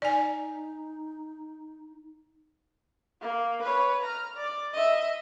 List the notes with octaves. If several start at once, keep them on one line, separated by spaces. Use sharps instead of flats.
D#4 D5 G#5
A#3
B4 C#5
A#5 F6
D5
D#5 E5